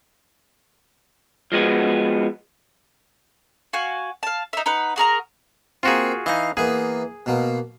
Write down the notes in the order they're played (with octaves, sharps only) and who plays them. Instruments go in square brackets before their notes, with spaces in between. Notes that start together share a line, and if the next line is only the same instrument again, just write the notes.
[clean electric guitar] F3 G#3 B3 F#4
[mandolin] F#4 F5 G#5
F5 A5
D#4 E5
D#4 B4 F#5
F#4 G#4 A#4 A#5
[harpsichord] A#3 C4 [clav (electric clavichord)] F4 F#4 G#4
[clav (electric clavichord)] E3 D#4 [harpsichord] D#5 F5
[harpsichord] E3 A#3 B3 [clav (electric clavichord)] G#4
[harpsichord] B2 A#3